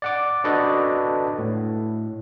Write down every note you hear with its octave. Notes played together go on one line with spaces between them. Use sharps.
D5 F#5 D6
D4 F#4 A4 B4 D5 D#5
A2